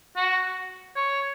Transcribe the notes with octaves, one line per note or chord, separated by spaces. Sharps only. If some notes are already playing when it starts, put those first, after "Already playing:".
F#4
C#5